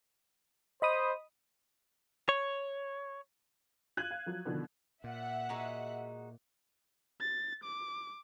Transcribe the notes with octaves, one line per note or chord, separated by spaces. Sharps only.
C5 D#5 B5 D#6
C#5
F4 F#6 G#6 D#7 F#7
F5
F3 F#3
B2 D3 D#3 F3
A#2 E5 F#5
G#3 D#4 F#4
A6
D6